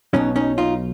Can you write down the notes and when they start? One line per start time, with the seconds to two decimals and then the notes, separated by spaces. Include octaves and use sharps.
0.13 B1 B2 F#3 C#4 D#4
0.36 C#4 D#4
0.58 D#4 F4